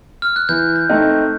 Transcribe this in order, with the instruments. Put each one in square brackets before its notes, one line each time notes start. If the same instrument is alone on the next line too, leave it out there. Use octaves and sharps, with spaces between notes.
[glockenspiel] F6
F#6
[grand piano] E3 [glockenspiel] G6
[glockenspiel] G6
[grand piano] A3 C4 D#4